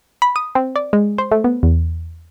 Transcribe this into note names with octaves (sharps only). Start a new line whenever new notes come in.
B5
D#6
C4
D5
G#3
C5
A3
B3
E2